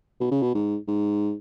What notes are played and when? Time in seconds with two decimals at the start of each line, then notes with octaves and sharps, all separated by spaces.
0.20 B2
0.31 C#3
0.42 B2
0.54 G#2
0.88 G#2